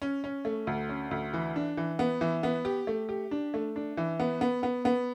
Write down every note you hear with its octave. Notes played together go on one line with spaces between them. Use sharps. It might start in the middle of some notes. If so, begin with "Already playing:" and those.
C#4
C#4
A3
D2
C#4
D2
E3
D4
E3
B3
E3
B3
G4
A3
G4
D4
A3
D4
E3
B3
B3
B3
B3